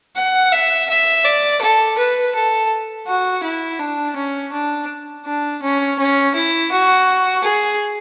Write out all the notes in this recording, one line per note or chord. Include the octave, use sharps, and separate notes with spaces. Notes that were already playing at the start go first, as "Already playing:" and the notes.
F#5
E5
E5
D5
A4
B4
A4
F#4
E4
D4
C#4
D4
D4
C#4
C#4
E4
F#4
G#4